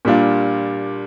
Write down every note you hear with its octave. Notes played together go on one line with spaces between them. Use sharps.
A#2 G3 D4 F4